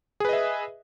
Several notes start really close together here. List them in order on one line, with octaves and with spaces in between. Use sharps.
G#4 B4 D#5 E5